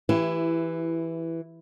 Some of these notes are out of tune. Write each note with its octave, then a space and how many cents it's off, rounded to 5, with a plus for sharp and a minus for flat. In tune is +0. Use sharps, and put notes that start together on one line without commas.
E3 +0 E4 +15 G4 +0